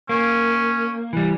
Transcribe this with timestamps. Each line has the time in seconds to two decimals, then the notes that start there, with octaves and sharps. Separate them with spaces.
0.09 A#3 C#4
1.13 E3 G3